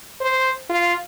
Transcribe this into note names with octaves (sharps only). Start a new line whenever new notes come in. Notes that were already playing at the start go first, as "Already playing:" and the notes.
C5
F4